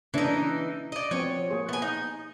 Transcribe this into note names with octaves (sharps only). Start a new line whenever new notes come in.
C#3 E3 A#3 D4 D#4
D5 D#5
F3 B3 C4 C#5
A#3 G#4 C5
B3 G#5
D#4